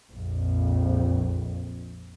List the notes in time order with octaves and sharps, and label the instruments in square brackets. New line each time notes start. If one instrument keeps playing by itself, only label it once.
[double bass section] A#1 F2